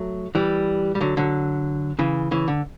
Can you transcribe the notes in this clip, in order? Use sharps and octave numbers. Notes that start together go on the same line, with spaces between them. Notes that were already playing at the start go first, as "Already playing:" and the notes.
Already playing: F#3 A3
E3 G3
G3
D3 F#3
D3 F#3
C#3 E3
C#3 E3
D3